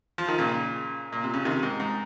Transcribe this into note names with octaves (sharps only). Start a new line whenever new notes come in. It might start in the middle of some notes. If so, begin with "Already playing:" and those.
F3
D#3
A#2 C#3
A#2
C3
C#3
C3 D#3
G#2
G#2